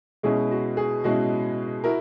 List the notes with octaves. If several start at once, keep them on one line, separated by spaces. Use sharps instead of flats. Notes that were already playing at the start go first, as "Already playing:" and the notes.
B2 G#3 C#4 E4 G#4
F#4
G#4
B2 G#3 C#4 E4 F#4
E4 F#4 A#4